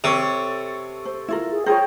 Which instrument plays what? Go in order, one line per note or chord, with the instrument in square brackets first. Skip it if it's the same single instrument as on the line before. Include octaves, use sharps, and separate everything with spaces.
[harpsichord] C3 [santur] A4 C#5 C#6
[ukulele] C5
E4 F4 A#4
[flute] G#4
[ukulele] F4 G#4 A#4 [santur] C5 C#5 [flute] G5